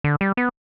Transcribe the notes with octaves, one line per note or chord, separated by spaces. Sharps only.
D3
G3
B3